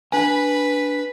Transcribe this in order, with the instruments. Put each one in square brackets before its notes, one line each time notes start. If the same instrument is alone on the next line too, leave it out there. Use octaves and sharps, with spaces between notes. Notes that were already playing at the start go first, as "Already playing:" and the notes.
[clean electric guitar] D4 G#5 [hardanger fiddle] B4 B5